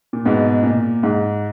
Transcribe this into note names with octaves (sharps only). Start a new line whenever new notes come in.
A#2
G#2 B2
A#2
G#2